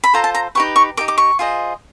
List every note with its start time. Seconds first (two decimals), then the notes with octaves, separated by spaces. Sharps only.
0.04 B5
0.14 F4 A4 C5 A#5
0.24 A5
0.35 A#5
0.55 D#4 G4 B4 C#6
0.76 C#6
0.97 D#4 G4 A#4 D6
1.08 D6
1.18 C#6
1.39 F4 G#4 C5 D#5